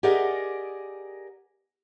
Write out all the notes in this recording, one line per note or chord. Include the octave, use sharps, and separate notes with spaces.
G4 G#4 A#4 D5 D#5 F#5